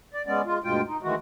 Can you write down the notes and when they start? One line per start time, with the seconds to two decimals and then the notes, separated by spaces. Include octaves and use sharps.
0.14 D5
0.27 G#3 B3 C#4 D5
0.46 G#3 F4
0.64 D2 G2 B2 G#3 F4 G5
0.87 D#4
1.03 D#3 E3 G#3 A3 F#4